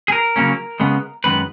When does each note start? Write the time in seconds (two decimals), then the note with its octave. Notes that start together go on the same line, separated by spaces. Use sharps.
0.08 G#4
0.12 A#4
0.36 C#3 F#3 A#3 C#4
0.80 C#3 G#3 B3
1.24 F#2 D#3 G#3 B3 B4